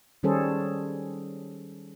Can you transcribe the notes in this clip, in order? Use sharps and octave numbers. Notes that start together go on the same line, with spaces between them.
D#3 G3 C#4 G#4 A4 C5